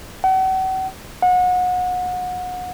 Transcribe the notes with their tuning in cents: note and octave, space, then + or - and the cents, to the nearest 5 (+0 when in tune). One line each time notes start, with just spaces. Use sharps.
F#5 +40
F#5 -30